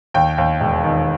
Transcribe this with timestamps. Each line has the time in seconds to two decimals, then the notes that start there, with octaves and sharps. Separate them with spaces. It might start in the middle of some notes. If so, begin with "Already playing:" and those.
0.14 D#2 G5
0.38 D#2
0.60 E1
0.83 D#3